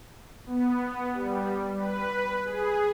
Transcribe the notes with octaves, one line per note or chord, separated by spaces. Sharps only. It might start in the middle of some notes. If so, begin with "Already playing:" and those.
B3
G3
B4
G#4